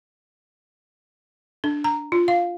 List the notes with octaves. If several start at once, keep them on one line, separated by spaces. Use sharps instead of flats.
D4
A#5
F4
F5